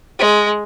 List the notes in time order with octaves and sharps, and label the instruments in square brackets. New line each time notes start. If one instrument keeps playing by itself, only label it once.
[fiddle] G#3